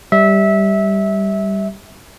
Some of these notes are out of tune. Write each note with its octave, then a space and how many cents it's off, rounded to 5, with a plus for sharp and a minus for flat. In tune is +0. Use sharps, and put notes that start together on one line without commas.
G3 +0 E5 -20